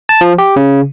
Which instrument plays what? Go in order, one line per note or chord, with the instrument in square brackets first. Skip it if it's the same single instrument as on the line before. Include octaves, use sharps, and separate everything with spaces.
[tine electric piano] A5
F3
G4
C#3